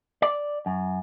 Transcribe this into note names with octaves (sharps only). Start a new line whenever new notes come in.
D5
F#2